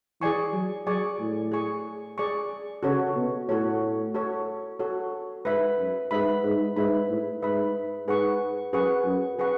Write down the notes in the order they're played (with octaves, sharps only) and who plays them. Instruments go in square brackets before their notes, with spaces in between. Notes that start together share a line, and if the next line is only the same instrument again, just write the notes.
[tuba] E3 [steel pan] G#4 D5 G#5 C#6
[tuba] F#3
[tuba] F#3 [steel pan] G#4 D5 G#5 C#6
[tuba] A2
[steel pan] G#4 D5 G#5 C#6
G#4 D5 G#5 C#6
[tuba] C#3 [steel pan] F#4 A4 C#5
[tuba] B2
[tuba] A2 [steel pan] F#4 A4 C#5
[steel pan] F#4 A4 C#5
F#4 A4 C#5
[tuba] G#2 [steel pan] B4 E5 B5
[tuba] F#2
[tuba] G#2 [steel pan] B4 E5 B5
[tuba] G#2
[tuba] G#2 [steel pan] B4 E5 B5
[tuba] A2
[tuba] G#2 [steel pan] B4 E5 B5
[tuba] G#2 [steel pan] G#4 B4 F#5 C#6
[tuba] F#2 [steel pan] G#4 B4 F#5 C#6
[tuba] F#2
[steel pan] G#4 B4 F#5 C#6